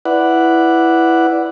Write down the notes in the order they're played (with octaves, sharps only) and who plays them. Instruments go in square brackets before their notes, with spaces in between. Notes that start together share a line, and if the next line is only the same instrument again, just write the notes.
[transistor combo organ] E4 B4 D5 F#5